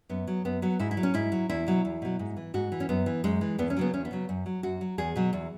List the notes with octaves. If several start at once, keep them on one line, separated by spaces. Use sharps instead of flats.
F#2 B3
F#3
F#2 B3
F#3 B3
G#2 E4
E4
F#3
C#4
G#2 E4
F#3
E2 E4
B2 F#3
E2
B2 F#3
G#2
E3
G#2 F#4
E3
C#4
F#2 B3
E3
F#2 G#3
E3
E2 B3
C#4
C#3 F#3 B3
E2 C#4
B3
C#3 F#3
F#2
F#3
F#2 F#4
F#3
E2 G#4
B2 F#3
E2